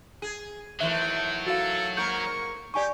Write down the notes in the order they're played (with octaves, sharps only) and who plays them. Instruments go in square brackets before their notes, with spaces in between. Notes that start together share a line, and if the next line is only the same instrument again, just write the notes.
[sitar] G#4
[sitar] D#3 E3 A3 [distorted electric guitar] F#3 [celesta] E5
[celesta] F#4 F5 [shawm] A4
[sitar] G#2 A#3 A#4 [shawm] C#6 [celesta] G6
[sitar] D#4 G4 [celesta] D5 G#5 C#6